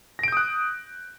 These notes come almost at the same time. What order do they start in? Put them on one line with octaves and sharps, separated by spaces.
A#6 D7 G6 D#6 F#6